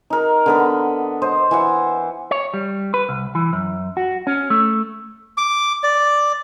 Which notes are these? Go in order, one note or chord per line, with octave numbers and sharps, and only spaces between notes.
D#4 A#4
D3 B3 B5
C5 D#5
E3 E5 F#5
C#5
G3
B4
C2
E3
F#2
F#4
C#4
A3
D6
D5